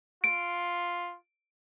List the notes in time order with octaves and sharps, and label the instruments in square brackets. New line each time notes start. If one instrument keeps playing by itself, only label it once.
[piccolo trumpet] F4 [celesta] D7